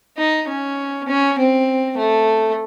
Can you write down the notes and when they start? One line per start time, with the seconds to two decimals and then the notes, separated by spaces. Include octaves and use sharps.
0.18 D#4
0.48 C#4
1.08 C#4
1.38 C4
1.98 A3